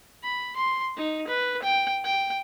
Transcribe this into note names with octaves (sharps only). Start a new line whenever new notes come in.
B5
C6
D#4
B4
G5
G5